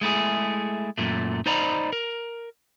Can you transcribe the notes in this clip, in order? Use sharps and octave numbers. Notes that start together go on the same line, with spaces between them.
G#3 A3 E4 G#4
F#2 A#2 A3
D#4 C5 D5 D#5 A#5 B5
A#4